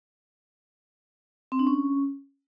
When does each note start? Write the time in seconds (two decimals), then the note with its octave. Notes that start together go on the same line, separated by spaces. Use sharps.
1.52 C4
1.59 D4
1.67 C#4